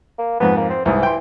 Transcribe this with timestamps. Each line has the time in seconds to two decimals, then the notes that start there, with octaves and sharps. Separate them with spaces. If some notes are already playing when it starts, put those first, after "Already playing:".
0.18 A#3
0.40 F2 G#2 B3
0.57 A#3
0.70 C4
0.85 C2 G#2 E3 D#6
1.03 G5 C6